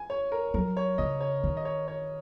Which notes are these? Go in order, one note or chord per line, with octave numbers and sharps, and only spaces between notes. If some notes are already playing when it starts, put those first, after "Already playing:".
Already playing: G#5
C#5
A#4
F#3 A#4
C#5
C#3 D#5
C#5
D#3
D#5
C#5
C#5